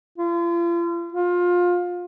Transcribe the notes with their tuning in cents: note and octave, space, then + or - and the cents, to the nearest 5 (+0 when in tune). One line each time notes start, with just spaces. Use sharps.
F4 -40
F4 +20